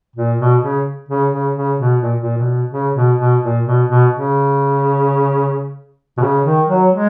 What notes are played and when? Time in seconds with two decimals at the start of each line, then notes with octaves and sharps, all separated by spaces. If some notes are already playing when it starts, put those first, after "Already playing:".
0.16 A#2
0.39 B2
0.62 C#3
1.09 C#3
1.32 C#3
1.55 C#3
1.79 B2
2.02 A#2
2.22 A#2
2.38 B2
2.72 C#3
2.95 B2
3.19 B2
3.42 A#2
3.65 B2
3.88 B2
4.13 C#3
6.17 B2
6.22 C#3
6.45 D#3
6.68 F#3
6.91 G#3